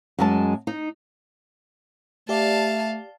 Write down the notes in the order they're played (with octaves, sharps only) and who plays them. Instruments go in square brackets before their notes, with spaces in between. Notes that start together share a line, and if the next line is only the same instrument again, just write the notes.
[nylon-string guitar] F#2 G#3 A5
D#4
[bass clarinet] A3 [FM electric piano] G4 D5 [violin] F5 A5